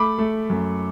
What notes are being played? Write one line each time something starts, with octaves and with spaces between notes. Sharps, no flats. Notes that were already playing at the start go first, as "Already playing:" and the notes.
Already playing: A3 B5 D6
A3
F#2